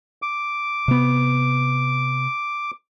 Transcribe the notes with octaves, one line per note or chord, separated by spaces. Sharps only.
D6
C3 B3